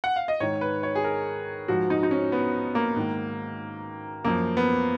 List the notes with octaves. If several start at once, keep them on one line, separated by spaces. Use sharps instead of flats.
F#5
F5
D#5
G#2 D#3 C#5
B4
C#5
G#4
A#4
G#2 F3 F#4
D#4
D#4
C#4
B3
A#3
G#2 D#3
F#2 F3 A#3
B3